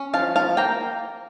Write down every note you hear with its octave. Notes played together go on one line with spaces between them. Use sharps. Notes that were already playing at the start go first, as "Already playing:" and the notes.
Already playing: C#4
F3 F5 A5
F3 F5 A5
A#3 G5 A#5